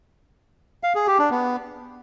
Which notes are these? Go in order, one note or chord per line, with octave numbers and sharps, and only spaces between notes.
F5
G#4
G4
D4
B3